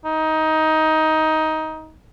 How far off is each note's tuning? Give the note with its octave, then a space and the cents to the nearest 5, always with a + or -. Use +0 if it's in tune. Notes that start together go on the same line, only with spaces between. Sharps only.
D#4 +15